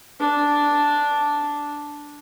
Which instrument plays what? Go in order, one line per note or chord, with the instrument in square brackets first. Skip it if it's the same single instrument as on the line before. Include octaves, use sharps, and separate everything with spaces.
[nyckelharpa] D4